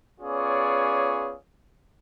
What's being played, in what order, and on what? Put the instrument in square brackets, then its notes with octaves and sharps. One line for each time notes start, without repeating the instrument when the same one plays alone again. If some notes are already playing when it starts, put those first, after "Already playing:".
[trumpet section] B3 C#4 F4 G#4 C#5 D5